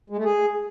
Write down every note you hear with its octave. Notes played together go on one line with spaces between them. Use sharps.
G#3
A3
G#4